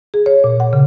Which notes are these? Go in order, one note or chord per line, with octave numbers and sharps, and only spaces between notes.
G#4
C#5
A#2
F#5
C#3